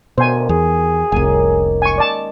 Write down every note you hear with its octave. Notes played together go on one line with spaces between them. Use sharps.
D2 B2 D#3 F#4 G4 C5 G#5
E2 G#4
F1 C2 D#3 A#3 C#4 G#5
G#3 G#5 C#6
D5 A5